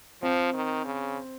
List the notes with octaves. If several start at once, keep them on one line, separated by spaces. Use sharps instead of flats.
F3 C4
D#3
C#3